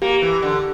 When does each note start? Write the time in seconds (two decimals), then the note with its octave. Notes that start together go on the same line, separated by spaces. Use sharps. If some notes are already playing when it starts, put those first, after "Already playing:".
0.02 A#3 G4
0.22 E3
0.42 D3